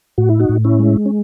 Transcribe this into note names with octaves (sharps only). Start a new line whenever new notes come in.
A2 F#4
E4
D#4 F#4
A2
C#4 E4
G#3
C#4